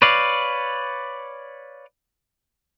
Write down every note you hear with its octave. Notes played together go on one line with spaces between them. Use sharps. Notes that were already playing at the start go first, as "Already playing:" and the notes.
B4 C#5 D5 F5